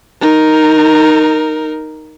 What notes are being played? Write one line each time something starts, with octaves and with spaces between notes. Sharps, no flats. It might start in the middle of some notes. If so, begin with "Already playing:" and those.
D#4 A#4